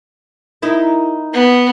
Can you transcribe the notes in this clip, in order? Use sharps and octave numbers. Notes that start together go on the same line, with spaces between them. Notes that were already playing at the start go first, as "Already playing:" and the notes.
D#4 E4 A#4
B3